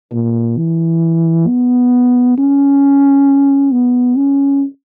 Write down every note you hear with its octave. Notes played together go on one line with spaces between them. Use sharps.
A#2
E3
B3
C#4
B3
C#4